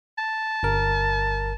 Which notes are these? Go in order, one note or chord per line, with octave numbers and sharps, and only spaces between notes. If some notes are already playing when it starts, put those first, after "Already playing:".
A5
G1 A#4